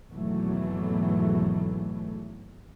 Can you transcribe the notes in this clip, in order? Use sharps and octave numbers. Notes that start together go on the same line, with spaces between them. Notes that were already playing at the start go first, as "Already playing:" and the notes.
G#1 E2 B2 E3 F#3 A3